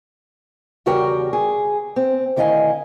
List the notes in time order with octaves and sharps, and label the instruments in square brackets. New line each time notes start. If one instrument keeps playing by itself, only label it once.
[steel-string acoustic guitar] E2 C#3 G3 F#4 A#4 G5
G#4
C4
D2 D#3 E4 D#5 F5 G#5